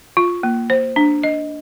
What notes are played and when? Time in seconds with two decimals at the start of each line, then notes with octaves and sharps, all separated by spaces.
0.17 F4
0.43 A#3
0.70 C5
0.96 D4
1.23 D#5